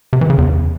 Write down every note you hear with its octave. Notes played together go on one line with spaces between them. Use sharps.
C3
E3
C#3
E2